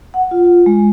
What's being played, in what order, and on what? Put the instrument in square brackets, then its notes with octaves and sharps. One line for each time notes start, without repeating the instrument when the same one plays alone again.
[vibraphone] F#5
F4
G#3